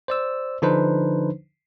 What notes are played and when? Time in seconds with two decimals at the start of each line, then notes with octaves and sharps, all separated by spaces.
0.08 C5 D5 E6
0.62 D3 F3 D4 D#4 B4 C5